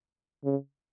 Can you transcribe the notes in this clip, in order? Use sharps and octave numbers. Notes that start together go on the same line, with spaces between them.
C#3